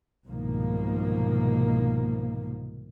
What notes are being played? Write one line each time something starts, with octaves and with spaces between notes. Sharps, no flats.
C2 G#2 B2 D#3 F3 A#3